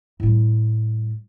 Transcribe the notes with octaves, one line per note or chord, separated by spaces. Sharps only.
A2 G3